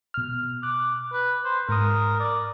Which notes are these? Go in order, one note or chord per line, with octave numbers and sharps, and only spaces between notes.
B2 F6
D6 F#6
B4
C5
G#2 A#4 D#6
D5